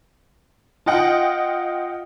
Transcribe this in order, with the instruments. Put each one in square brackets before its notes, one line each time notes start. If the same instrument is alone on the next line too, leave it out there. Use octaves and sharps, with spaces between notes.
[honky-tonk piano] F4 D#5 F#5 G5